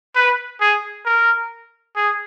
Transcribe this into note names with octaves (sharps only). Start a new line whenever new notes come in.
B4
G#4
A#4
G#4